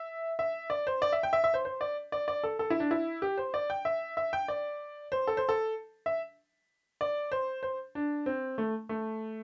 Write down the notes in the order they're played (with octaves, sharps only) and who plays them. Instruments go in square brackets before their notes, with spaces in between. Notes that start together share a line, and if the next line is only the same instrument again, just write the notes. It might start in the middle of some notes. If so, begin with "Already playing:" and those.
Already playing: [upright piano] E5
E5
D5
C5
D5
E5
G5
E5
E5
C5
C5
D5
D5
D5
A4
A4
E4
D4
E4
G4
C5
D5
G5
E5
E5
G5
D5
C5
A4
C5
A4
E5
D5
C5
C5
D4
C4
A3
A3